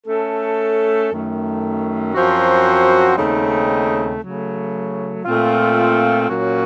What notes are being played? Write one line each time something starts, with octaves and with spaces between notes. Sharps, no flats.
A3 C#4 A4
F#2 D#3 A3
F#2 F3 C4 F#4
D#2 C#3 A3 C4 D#4
C#3 F#3 A3
A#2 A3 C4 F4
A#2 F#3 A#3 C#4 F#4